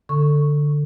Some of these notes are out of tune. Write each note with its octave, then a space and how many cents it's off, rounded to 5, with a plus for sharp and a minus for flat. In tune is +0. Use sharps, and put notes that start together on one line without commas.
D3 +0 A4 +15 C#6 -5